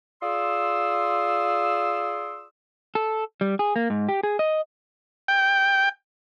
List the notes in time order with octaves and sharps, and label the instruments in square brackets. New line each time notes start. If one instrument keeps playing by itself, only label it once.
[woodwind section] F4 G#4 D5 C6 D#6 E6
[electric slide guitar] A4
G3
G#4
A#3
G#2
G4
G#4
D#5
[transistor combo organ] G5